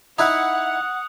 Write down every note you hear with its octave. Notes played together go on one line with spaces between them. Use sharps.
D#4 E4 F#5 D#6 F#6 F7